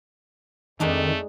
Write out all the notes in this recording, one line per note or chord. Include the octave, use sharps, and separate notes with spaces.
F2 D#3 G#3 A3 D4 D#4